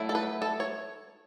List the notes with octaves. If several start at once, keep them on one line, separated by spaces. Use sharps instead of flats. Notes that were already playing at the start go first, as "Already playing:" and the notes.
Already playing: F#3 A3 E4
A4
B4
A4
C#5